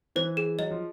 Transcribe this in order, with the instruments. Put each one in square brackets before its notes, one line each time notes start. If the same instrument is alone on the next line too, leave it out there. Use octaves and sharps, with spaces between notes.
[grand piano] E3 [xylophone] C5
[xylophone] G#4
[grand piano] F#3 [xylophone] D#5
[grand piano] F3